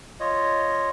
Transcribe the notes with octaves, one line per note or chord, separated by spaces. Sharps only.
F4 C#5 D#5